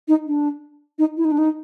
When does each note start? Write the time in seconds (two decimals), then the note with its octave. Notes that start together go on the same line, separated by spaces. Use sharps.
0.08 D#4
0.26 D4
0.99 D#4
1.17 E4
1.25 D#4
1.32 D4
1.39 D#4